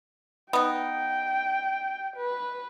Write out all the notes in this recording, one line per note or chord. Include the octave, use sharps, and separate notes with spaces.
B3 D#4 G5
B4